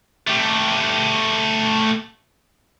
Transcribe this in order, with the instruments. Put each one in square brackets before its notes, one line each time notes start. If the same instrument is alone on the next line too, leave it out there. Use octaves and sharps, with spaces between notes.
[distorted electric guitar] A3 G4